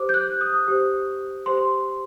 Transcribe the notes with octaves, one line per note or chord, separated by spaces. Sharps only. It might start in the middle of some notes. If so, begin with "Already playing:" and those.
Already playing: G4 C5 D6
G6
F#6
D#6
G4 C5
G4 C5 C6